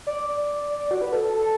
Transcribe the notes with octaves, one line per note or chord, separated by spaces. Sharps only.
D5
F#4
B4
A4
A4